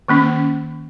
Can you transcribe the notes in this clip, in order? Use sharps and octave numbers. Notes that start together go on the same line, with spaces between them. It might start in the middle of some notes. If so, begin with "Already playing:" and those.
D#3 A#3 C#4